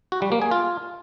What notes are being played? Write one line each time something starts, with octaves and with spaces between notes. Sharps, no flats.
F#4
G3
A#3
G#4
F4